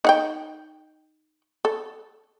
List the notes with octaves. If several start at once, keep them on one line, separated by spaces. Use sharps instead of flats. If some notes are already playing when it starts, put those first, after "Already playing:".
D#4 F#5 G5
A4